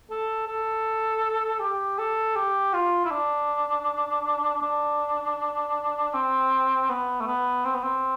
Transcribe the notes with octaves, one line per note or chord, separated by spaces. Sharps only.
A4
A4
G4
A4
G4
F4
E4
D4
D4
C4
B3
A3
B3
C4
B3
C4